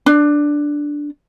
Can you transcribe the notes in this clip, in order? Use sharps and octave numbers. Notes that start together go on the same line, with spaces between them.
D4